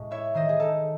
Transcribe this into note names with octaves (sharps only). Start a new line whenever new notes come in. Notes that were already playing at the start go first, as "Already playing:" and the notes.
Already playing: A2 G#3
E4 C#5 E5
D#3 C5 D#5
G#4
D#4 A4